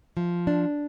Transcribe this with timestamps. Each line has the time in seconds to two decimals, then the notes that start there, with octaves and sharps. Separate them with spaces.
0.17 F3
0.47 D4